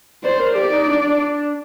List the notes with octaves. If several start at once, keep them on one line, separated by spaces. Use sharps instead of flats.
C5 D5
A#4
G4 D5
D#4
D4
D4